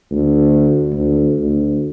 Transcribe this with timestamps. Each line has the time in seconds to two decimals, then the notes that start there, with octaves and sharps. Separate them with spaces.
0.11 D2
0.92 D2
1.39 D2